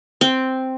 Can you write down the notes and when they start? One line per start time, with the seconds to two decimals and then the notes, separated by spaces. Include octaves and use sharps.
0.21 C4